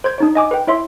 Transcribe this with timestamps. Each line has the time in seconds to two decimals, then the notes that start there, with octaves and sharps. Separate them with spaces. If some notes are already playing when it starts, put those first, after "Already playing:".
0.04 C5 G6 G#6
0.18 D4 D#4 C#5
0.35 D#5 G#5 D6
0.51 B4 G5
0.67 E4 C#5 E5 C6